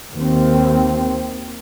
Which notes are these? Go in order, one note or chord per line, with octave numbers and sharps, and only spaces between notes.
D#2 C4